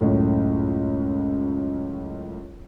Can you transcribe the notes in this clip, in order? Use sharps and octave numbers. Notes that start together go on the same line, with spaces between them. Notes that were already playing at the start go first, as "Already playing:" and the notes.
C#2 F#2 A2